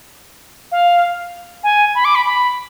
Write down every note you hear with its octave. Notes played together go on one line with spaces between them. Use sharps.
F5
G#5
B5
D6
B5
B5